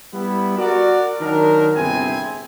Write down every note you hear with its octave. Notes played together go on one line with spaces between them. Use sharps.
G3 B3 E4
F#4 A#4 D5
D#3 F#3 D4 A#4
G1 C3 C4 E4 G#4 G#5